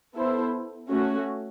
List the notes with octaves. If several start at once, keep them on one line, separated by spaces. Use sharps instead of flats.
B3 E4 A4 C5
A3 C#4 F#4